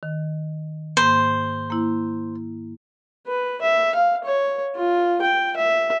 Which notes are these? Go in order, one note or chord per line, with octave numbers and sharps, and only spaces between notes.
D#3
G#2 A#3 C5 B5
A#3 E4
B4
E5
F5
C#5
F4
G5
E5